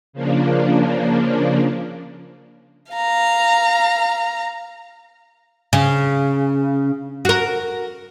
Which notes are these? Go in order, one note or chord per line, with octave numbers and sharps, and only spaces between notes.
C#3 F3 A#3 D4
F5 A#5
C#3
F#4 A#4